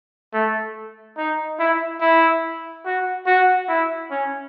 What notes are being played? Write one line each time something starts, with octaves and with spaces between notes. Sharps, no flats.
A3
D#4
E4
E4
F#4
F#4
E4
C#4